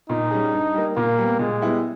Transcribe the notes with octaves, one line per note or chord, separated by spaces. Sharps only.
A#2 D#4
G3 C#4 G#4
G2
G3 A#3
A#2 A#3
G3 B3
A#2 G#3
G3 B3 E4